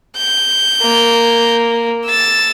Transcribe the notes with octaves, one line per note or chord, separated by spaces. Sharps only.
G6
A#3
E6 A6